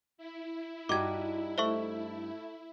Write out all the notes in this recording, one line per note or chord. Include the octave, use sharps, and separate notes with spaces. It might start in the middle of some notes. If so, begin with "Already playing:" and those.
E4
G2 G3 D#4 F#4 G4 D6 G#6
A3 C5 E5 C#6